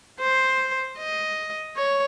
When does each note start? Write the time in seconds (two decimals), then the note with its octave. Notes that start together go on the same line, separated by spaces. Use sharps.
0.20 C5
0.99 D#5
1.77 C#5